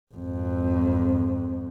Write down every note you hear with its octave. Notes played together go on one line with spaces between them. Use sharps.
G#1 F2